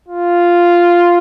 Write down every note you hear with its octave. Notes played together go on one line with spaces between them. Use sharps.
F4